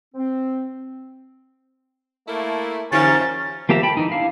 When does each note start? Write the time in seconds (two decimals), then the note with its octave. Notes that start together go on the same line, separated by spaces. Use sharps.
0.15 C4
2.28 A3 A#3 E4
2.92 F#2 D3 F3 C#4 G4 A#4 A6
3.69 F3 A#3 G4 E5 A#5
3.83 A4 G5 B5
3.97 E3 D#4
4.12 D4 E4 F5